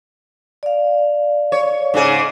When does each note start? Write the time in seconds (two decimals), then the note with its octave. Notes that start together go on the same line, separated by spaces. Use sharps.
0.63 D5 F5
1.52 C#5
1.94 G#2 C#3 G#4